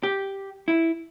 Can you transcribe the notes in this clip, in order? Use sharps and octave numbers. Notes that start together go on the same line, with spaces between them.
G4
E4